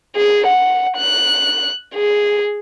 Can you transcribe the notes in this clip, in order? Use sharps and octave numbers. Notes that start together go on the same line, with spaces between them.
G#4
F#5
F#6
G#4